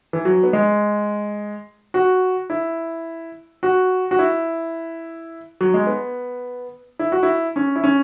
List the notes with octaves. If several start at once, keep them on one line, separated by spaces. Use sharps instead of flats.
E3
F#3
B3
G#3
F#4
E4
F#4
F#4
E4
F#3
G#3
B3
E4
F#4
E4
C#4
E4
C#4